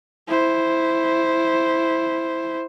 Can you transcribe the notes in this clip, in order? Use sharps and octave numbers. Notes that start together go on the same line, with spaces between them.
E4 C5